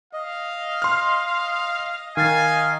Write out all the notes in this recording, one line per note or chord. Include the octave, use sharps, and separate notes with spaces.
D#5 F5
C6 F6
D#3 F5 G#5 A6